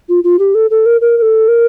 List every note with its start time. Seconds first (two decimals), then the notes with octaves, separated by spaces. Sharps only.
0.09 F4
0.24 F4
0.39 G4
0.55 A4
0.70 A4
0.86 A#4
1.01 A#4
1.17 A#4
1.22 A4
1.48 A#4